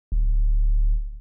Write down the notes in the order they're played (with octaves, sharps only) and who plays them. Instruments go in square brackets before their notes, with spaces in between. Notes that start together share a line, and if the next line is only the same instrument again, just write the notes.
[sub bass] D1